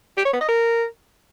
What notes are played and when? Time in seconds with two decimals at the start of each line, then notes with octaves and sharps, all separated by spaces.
0.17 G4
0.25 C#5
0.33 B3
0.41 D#5
0.49 A#4